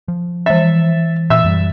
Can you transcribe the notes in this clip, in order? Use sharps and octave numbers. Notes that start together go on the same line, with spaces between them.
F3
E3 E5 A6
A#2 E5 E6
F#2 G3